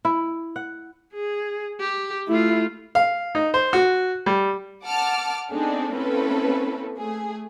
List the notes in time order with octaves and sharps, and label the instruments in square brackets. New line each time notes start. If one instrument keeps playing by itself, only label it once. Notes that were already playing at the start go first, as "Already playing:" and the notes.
[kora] E4
F#5
[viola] G#4
G4
[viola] A3 F4 [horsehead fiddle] E4
[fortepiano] F5
D#4
C5
F#4
G3
[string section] F#5 A5 D6 F6
B3 C4 D4 D#4 G#4 A4
A#3 C4 C#4 E4 A4 B4
A3 G#4